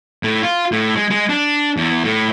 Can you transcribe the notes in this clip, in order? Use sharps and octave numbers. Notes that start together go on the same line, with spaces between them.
A2
F4
A2
G#3
G#3
D4
E2
A2